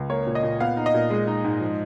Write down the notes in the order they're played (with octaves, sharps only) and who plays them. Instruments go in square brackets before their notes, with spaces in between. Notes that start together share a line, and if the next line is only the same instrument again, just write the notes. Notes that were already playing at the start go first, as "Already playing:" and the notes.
Already playing: [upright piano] C#2
A#3 C#5
A#2
D#5
A#2
B3 F5
D#4
D#5
A#2
G#3
D#4
G#2
F3